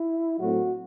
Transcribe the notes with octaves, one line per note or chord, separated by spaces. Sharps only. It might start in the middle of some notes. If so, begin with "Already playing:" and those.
Already playing: E4
A2 F#3 A3 C4 F#4